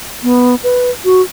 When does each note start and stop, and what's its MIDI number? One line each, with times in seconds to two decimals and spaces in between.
0.23 0.55 59
0.63 0.90 71
1.05 1.22 66